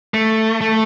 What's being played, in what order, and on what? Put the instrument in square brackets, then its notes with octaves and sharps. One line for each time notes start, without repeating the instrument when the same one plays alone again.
[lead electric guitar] A3
A3